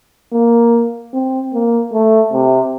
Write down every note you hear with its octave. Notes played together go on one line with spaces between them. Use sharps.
A#3
C4
A#3
A3
C3